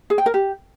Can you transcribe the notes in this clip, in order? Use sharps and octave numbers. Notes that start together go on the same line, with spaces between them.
G#4
G5
A#4
G4